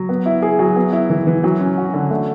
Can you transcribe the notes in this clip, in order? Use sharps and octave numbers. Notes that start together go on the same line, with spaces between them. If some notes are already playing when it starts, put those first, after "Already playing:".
Already playing: F#3
B3
E4
G#4
F#3
B3
E4
E3
E3
F#3
C#4
F#4
D3
A3